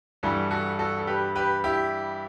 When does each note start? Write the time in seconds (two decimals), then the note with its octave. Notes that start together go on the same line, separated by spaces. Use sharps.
0.23 G2 E3 G3 F#4 A4
0.51 F#4 A4
0.79 F#4 A4
0.99 A4
1.07 G4 B4
1.36 G4 B4
1.64 E4 G4